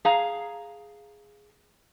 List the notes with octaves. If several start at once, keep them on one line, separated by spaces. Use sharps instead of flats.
G#4 F5 A#5